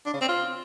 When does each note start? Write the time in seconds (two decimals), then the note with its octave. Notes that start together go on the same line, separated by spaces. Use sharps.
0.06 D4
0.13 C#3
0.21 C4
0.28 F4